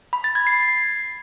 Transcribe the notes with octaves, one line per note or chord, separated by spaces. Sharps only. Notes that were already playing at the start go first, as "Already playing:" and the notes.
B5
A6
G#6
C7